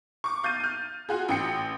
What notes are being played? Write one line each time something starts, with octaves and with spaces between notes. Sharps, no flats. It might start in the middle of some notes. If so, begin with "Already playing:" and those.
C#6 D6
F5 G6 A6 D#7
F6 G6
F4 F#4 G#4
A1 G5 C#7